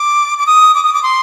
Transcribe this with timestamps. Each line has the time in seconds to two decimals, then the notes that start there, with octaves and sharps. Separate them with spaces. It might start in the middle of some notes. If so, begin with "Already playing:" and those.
Already playing: D6
0.38 D6
0.46 D#6
0.75 D6
0.84 D#6
0.94 D6
1.03 C6